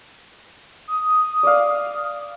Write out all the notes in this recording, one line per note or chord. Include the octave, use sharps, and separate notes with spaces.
D#6
D5 F5